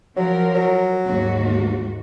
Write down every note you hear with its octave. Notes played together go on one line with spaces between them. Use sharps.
F3 F#3 A#4
F#3
D#2 G#2 F#4